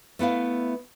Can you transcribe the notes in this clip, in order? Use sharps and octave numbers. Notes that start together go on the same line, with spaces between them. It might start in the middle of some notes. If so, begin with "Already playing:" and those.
A3 B3 E4 F5